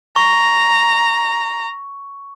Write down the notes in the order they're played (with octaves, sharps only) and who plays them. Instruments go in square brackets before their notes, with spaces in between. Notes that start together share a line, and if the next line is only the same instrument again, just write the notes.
[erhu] A#5 [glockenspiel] C#6